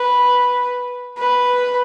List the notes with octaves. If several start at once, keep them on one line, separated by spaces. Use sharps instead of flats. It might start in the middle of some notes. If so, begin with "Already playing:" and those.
Already playing: B4
B4